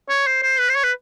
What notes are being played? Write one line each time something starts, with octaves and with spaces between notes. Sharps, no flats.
C#5
C5
C5
B4
C5
C#5
B4